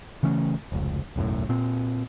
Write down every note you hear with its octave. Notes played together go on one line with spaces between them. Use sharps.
C#3 E3 A3 C#4
F1 C#2
E1 B1 F#2 A2
A#2 C4